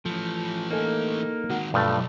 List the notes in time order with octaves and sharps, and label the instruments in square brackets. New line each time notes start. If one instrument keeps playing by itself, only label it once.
[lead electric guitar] E3 A3 [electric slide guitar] F3
[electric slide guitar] A#3 D#4 [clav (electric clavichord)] A4 G#5
[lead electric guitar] D#3 G#3 [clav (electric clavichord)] F#4
[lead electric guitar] B1 [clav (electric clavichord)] G2 F3 A3